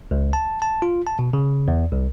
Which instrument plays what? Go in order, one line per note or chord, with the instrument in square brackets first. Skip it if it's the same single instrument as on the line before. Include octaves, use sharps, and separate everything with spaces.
[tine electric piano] C#2
A5
A5
F4
A5
B2
C#3
E2
C2